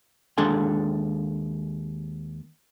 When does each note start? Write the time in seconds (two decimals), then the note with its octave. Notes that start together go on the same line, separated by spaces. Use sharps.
0.38 D#2 G#3 D4 A4 G#5 C6